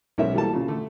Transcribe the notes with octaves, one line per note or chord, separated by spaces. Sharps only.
B1 G#2 C#4 A#4 E5
E3 G3 A#3 F#4 A4 A5
A#2 C#3
D3 A3